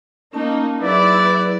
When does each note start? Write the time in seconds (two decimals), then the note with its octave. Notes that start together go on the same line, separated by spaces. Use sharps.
0.33 A#3 C#4 D#4 A5
0.81 F#3 E4 G#4 B4 D5